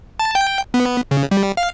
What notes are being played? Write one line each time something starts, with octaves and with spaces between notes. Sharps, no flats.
A5
G5
B3
C#3
G3
F5